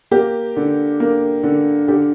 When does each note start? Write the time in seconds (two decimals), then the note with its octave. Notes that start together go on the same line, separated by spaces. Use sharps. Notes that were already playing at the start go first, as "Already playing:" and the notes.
0.11 A#3 G4
0.56 D3
1.00 A#3
1.43 D3
1.88 D3 G4